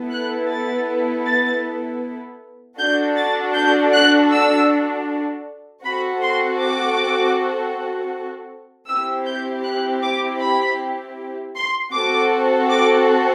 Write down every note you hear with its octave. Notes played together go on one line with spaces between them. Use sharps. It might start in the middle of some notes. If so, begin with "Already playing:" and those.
Already playing: B3 E4 A4
F#6
A6
A6
D4 F#4 A4 G6
A6
G6
F#6
E6
C4 F#4 A4 B5
C6
D6
C4 E4 G4 E6
G6
F#6
D6
B5
C6
C4 F#4 A4 D6
D6